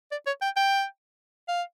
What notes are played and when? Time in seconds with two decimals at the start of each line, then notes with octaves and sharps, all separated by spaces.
0.12 D5
0.27 C#5
0.42 G5
0.56 G5
1.48 F5